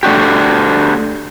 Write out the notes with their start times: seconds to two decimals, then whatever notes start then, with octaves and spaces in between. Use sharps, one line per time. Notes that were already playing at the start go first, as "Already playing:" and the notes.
0.03 A3 D4 F#4 G4